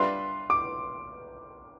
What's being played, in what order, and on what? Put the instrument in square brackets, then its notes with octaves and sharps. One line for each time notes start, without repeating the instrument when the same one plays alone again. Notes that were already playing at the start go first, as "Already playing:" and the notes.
Already playing: [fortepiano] G3 D4 F4 B4 E5 [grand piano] C6
[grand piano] D6